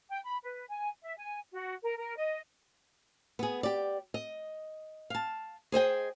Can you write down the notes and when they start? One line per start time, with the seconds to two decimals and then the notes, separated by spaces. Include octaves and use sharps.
0.10 G5
0.25 B5
0.43 B4
0.69 G#5
1.02 E5
1.17 G#5
1.53 F#4
1.83 A#4
1.98 A#4
2.17 D#5
3.39 B3 G#4
3.63 G4 D5
4.14 D#5
5.10 F5 A5
5.72 G#4 C5 D#5 G5